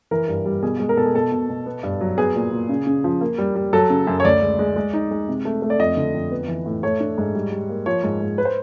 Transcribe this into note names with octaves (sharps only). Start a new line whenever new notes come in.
E3 A#4
G2
G3
B2 G#4
G#3
A#4
B2 A4
G#4
B2 A4
B2
B2
B3
G2
F#3
B3 G#4
A#2
A#2
C#3
C#3
F3
A#3
G3
G3
F#3 A4
C#3
F#2
C#5
D2 D5
G#3
G#3
G#3
D#4
G#3
C3
A3
A3
D5
F2 D#5
D3
F2
B3
E3
A2
A3 C#5
D4
G#2
G3
G3
A#3
F3 C#5
G#2
G#2
B4
C5